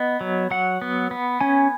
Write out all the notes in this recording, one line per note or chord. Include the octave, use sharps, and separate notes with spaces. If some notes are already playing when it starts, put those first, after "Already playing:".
Already playing: B3 D#5
F#3
F#3 F#5
B3
B3
C#4 G#5